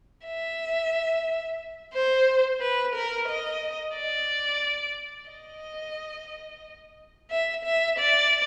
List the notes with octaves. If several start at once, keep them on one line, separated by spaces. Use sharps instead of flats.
E5
C5
B4
A#4
D#5
D5
D#5
E5
E5
D5